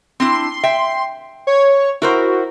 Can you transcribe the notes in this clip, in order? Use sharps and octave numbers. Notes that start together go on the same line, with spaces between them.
C4 D4 E4 C6
E5 G5
C#5
E4 F#4 A#4 C5